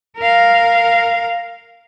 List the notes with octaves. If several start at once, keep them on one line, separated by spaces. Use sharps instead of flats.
A#4 F5